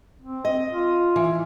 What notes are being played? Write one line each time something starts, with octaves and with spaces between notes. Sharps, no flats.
C4
D#5
F4
E3